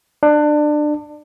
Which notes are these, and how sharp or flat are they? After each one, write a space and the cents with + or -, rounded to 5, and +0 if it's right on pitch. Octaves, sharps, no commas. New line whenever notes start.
D4 +25